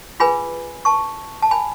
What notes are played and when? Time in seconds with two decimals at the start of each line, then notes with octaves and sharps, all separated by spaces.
0.20 F4 G#4 B4 G#5 B5
0.85 A5 C#6
1.42 A5
1.51 G#5 B5